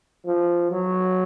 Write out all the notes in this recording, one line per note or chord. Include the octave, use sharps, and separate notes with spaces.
F3
F#3